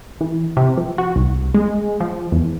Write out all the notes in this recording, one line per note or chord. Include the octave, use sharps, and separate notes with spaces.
E3
C3
F3
F#4
C2
G#3
F3
E2